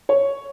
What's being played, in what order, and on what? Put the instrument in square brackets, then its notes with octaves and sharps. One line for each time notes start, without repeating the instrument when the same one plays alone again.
[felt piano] C#5